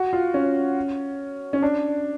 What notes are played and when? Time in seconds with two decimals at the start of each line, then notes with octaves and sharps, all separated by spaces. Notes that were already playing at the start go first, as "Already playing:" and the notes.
Already playing: F#4
0.13 F4
0.34 C#4
1.53 C#4
1.62 D4